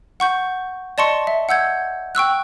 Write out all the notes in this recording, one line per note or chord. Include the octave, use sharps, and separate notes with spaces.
F#5 C#6 G6
D5 D#5 A5 C6 C#6 C#7
E5
F#5 E6 G6 G#6
G5 C#6 E6 F#6